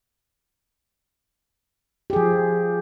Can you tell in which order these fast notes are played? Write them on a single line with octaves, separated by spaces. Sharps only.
G4 G#4 F3